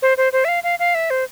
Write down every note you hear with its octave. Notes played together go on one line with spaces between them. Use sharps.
C5
C5
C5
E5
F5
F5
F5
E5
C5